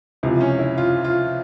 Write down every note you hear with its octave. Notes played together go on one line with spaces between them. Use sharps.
C#2 C3 F3 E4
C#4
E4
F4
F4